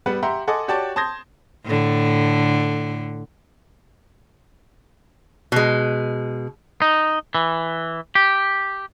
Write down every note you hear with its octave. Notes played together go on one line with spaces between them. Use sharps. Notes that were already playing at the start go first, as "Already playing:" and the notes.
G3 B3 B4 F#5
G4 E5 F#5 A#5 C6
A4 D#5 F#5 G#5 C6 D6
F#4 G4 C#5 D5 A5
A5 C6 D#6 G6 G#6 A#6
A2 D3
B2 G#3
D#4
E3
G4